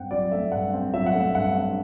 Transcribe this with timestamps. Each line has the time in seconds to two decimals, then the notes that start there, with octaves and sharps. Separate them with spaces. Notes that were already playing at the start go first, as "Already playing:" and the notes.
Already playing: G2 C4 F#5 G5
0.11 F#3 D5
0.32 A3 E5
0.52 G2 F#5
0.74 C4
0.93 F#3 E5
1.06 F#5
1.14 A3
1.20 E5
1.35 G2 F#5
1.57 C4